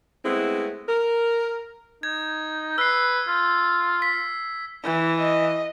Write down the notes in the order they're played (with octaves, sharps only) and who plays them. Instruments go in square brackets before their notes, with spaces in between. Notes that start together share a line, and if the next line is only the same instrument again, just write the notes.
[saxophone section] G#3 A3 B3 C4 E4
A#4
[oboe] D#4 [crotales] G#6
[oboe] B4 [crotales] E6 C7
[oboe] F4
[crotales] B6
[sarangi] E3
[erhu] D#5